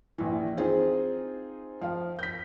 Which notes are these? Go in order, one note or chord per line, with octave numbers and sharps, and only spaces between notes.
A#1 E3
C4 D#4 F4 G#4
F3 F5
G6 B6